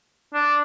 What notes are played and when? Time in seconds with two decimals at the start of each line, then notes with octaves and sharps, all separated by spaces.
0.34 D4